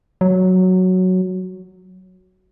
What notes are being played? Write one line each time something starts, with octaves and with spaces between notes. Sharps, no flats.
F#3